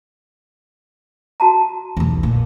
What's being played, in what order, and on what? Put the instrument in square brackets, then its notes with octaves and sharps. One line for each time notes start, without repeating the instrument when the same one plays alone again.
[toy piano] F#4 A5 A#5
[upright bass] B1 E2
A#2